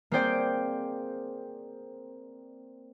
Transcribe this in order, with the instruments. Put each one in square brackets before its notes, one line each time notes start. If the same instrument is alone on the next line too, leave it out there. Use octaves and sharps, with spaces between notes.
[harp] A#3 C4 G#4 C5 D5 G5